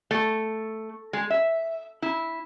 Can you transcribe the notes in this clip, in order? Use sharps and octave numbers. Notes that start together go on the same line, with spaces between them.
A3
G#3
E5
E4